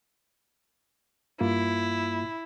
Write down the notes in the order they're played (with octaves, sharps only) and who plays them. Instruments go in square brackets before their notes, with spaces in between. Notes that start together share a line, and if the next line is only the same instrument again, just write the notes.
[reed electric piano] G2 A#3 F4 [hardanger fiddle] E4